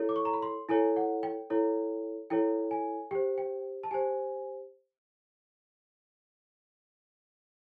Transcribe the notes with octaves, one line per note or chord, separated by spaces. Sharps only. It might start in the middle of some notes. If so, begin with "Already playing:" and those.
Already playing: E4 A4 C#5
D6
C#6
A#5
B5
C6
E4 A4 C#5 G#5
F#5
G5
E4 A4 C#5
E4 A4 C#5 G5
G#5
G4 C5 G5
G5
A5
G4 C5 G#5